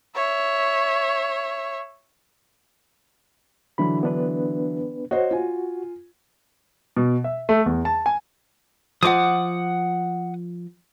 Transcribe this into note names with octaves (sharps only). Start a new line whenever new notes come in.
C#5 E5
D3 E3 F#3 B5
B3 D4 B4
F#4 C5 C#5 D#5
F4 G#5
B2
E5
A3
E2
A5
G#5
F3 D#5 F#5 D6 D#6